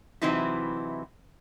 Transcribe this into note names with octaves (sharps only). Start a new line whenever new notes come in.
C3 E3 F#3 C4 D#4 E4